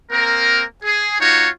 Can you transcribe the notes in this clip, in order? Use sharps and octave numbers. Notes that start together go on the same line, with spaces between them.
A#3 C4 A#4
G#4
A#3 D#4 F4 F#4 C#5